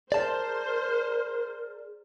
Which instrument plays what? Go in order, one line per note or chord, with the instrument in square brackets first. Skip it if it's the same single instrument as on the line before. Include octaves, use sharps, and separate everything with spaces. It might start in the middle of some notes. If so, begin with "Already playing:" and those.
[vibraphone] G#4 [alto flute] A#4 [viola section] C5 [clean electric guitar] D5 A5